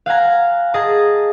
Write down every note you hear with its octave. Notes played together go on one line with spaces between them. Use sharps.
F5 F#5 G#5 A#5
G#4 D#5 A5 A#5